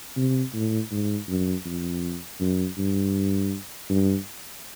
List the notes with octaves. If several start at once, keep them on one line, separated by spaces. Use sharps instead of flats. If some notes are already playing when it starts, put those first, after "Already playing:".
C3
A2
G#2
F#2
F2
F#2
G2
G2